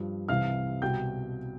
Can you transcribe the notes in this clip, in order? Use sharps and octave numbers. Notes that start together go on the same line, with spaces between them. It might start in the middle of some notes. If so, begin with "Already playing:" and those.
Already playing: G2 F3
C2 C3 E3 F5 F6
C2 B2 G5 G6